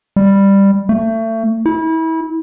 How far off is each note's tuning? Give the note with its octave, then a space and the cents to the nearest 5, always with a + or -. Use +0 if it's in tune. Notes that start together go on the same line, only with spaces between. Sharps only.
G3 +10
A3 +30
E4 -30